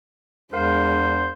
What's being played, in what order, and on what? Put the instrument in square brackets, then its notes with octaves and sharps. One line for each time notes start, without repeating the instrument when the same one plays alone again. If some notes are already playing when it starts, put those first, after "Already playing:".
[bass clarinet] E2 [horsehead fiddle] G#3 D4 [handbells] A#4 F5 [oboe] C5